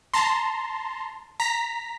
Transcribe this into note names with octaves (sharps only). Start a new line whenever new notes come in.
A5 A#5 C6
A#5 B6